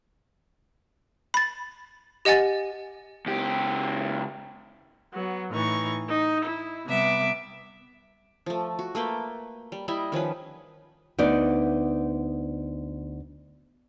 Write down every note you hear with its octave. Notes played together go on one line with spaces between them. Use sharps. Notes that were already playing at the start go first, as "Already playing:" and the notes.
B5 A6
G4 D#5 F#5 G#5 A6
C#2 G4
F#3 B3
A2 E3 D#4 C#6
D#4
E4
C3 G3 B3 E5 D6
F3 A3
F#4
A3 A#3 B4 G5
G3
G3 E4 D#5 E5
D#3 F3 C#4 B4
D2 B3 D#4 D5